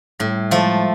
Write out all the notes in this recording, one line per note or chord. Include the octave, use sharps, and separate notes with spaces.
A2 G3
F3 G#3 A3